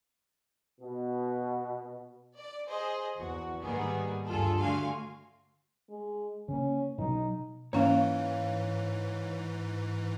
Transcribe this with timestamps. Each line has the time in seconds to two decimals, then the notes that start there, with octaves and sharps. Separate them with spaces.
0.81 B2
2.36 D5
2.67 G#4 C5 D#5
3.19 E2 F#4
3.61 G#2 D#3 G3 A#3 B3 G#4
4.26 D2 G2 F4 G#4 A4
4.60 D3 A3 F#4 F5 G#5 C6
5.89 G#3
6.48 C#3 A#3 C#4
6.98 B2 F#3 D#4
7.73 G#2 E3 A#3 C#4 C#5 F5